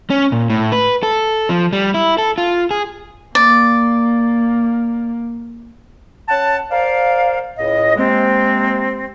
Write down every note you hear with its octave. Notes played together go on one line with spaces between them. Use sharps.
C#4
A#2
A2
B4
A4
F3
G3
E4
A4
F4
G#4
A#3 D5
C#4 F#5 A5
A#4 C5 D5 F5
C#2 A2 D#5
C3 G#3 A#3 C4